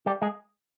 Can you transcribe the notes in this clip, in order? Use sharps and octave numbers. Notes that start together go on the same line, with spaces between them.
G3 G4
G#3 G#4